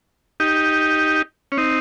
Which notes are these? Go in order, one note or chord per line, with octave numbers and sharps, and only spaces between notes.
D#4 G4
C#4
C4 D#4